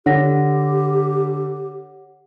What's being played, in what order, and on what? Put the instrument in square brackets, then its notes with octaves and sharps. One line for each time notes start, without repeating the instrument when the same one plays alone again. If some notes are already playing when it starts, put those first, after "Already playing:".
[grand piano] D3 [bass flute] G4 [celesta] C#5 F#5 A#6